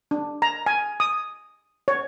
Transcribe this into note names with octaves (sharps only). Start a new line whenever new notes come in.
D4
A#5
G#5
D#6
C#5